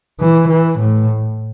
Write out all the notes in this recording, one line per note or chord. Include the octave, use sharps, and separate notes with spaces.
E3
E3
A2